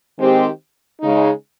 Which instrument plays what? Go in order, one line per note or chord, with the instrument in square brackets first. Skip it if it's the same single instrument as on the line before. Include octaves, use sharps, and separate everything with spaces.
[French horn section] D#3 G#3 C4 G4 C5
C#3 G#3 D#4